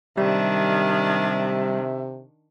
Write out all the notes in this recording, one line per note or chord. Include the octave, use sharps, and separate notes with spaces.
C3 D#3 G3 D4 E5